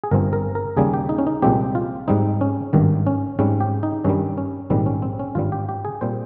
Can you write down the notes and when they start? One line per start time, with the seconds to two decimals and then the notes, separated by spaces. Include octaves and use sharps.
0.04 G#4
0.11 G1 G2 F3 C4 A#4
0.33 A#4
0.55 A#4
0.77 D#2 C#3 G3 A#3 G#4
0.94 G4
1.09 D#4
1.18 C#4
1.27 D#4
1.42 C2 A#2 F3 G#3 C4 G4
1.75 F4
2.08 G#2 G3 C4 D#4
2.41 C#4
2.73 G#1 G2 D#3
3.07 C#4
3.39 G#2 G3 C4 C#4
3.61 G4
3.83 D#4
4.04 G2 D#3 G3 C#4
4.38 C#4
4.70 A#1 G#2 D#3 G3 C4
4.86 C#4
5.02 C4
5.19 C#4
5.35 G#1 G2 G3 F4
5.52 G4
5.69 G4
5.85 G#4
6.01 A#2 G3 C4 C5